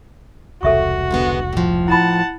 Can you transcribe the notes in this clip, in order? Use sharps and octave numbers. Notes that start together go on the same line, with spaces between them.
E1 C2 F#4 A4 E5 C#6
D3 G#3 B3
A2 F3
E4 F#5 A5 B5